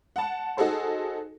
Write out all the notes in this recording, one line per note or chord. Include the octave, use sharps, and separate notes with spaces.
F#5 A5
D#4 F#4 G#4 A4 C5